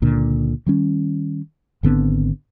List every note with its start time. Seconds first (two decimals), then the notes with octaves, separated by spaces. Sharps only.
0.02 C#2 A#2 D3
0.66 D#3 G3 C#4
1.83 G#1 D3 B3 C4